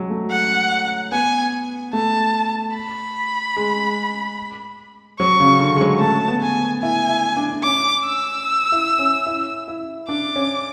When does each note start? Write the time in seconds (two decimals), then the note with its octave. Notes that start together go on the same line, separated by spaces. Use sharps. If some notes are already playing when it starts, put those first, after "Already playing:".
Already playing: F#3 G#3
0.10 A3
0.31 F#5
1.12 B3 G#5
1.93 A3 A5
2.75 B5
3.57 G#3
5.19 F#3 C#6
5.40 C#3
5.60 D3
5.76 G#3
5.81 F#3
6.00 A3 A5
6.28 B3
6.42 G#5
6.82 E4 G#5
7.09 E4
7.37 D4
7.52 D4
7.63 C#4 D6
8.05 E6
8.72 E4
8.99 C#4
9.26 E4
9.68 E4
10.08 D4 D6
10.36 C#4